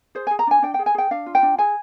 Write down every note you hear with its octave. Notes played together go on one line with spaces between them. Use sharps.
G#4 C5
G#4 G#5
A#5
D4 G#5
D4 G5
G#4 G5
G#5
G#4 G5
D4 F5
F4
G5
D4
G#4 G#5